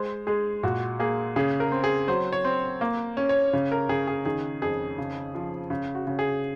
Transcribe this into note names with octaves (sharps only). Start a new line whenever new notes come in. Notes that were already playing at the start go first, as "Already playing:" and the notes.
Already playing: G#3 C5
G#3 G#4
A#2 F#4
A#3 G#4
C#3 G#4
A#4
C4
G#4
F#3 C5
C#5
C4
A#3
C#4
C#5
C#3
A#4
C#3 G#4
G#4
D#3 G#4
F2 G#4
C#3
F3
C#3
F#4
C#3
G#4